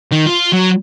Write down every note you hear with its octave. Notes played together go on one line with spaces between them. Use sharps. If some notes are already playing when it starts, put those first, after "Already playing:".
D#3
F4
F#3